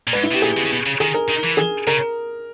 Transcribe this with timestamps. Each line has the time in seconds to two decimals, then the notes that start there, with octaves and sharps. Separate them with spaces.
0.07 A#2
0.13 G#2 B4
0.23 E4
0.31 B2 G4
0.42 A#2 G#4
0.57 B2
0.65 C#3
0.72 B2
0.86 C#3
1.00 D#3 G#4
1.14 A#4
1.29 D#3
1.43 E3
1.57 G#4
1.87 C#3 A#4